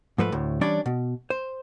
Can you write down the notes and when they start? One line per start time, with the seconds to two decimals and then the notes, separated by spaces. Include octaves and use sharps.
0.18 G#2 F3 A3 B4
0.32 D2 A2
0.61 E3 G3 C#4 D4 C#5 D5
0.86 B2
1.30 C5